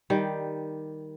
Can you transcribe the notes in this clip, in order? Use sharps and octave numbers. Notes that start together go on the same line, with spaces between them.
D#3 G3